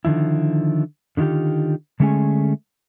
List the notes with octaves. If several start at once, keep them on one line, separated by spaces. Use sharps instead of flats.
D3 D#3 F3 E4
D3 D#3 E4 F4 G4
D3 G#3 A3 C#4 G#4 G#5